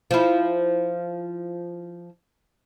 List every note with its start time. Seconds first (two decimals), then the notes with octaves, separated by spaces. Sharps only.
0.11 F3 E4